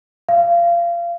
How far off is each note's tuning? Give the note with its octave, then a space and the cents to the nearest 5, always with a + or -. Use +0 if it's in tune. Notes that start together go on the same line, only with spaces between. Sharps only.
F5 -25